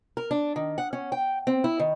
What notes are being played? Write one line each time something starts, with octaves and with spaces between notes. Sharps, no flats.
A#4
D4
D#3
F#5
C#4
G5
C4
E4
D#3